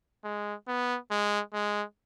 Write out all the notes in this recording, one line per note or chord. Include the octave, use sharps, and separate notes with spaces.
G#3
B3
G#3
G#3